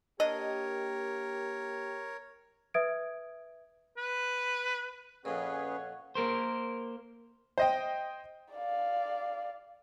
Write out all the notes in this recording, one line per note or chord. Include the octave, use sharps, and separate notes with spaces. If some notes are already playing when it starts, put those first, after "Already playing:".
A#3 D4 G4 A#4 C#5 D#5
B4 E5 D#6 G#6 D7
B4
F2 A#2 C#4 G#4 B4 C#5 F#5
A#3 A#4 C5
C5 D#5 G5
D5 F5